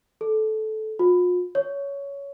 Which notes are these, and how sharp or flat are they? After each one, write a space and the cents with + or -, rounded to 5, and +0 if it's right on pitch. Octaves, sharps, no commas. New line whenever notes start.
A4 -15
F4 +45
C#5 +15